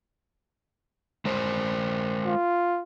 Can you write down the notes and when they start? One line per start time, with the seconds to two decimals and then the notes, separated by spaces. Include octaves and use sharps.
1.25 G#3 A#4 C5
2.26 F4